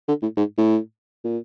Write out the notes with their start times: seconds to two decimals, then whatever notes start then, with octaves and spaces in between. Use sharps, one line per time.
0.08 D3
0.22 A2
0.37 G#2
0.58 A2
1.24 A#2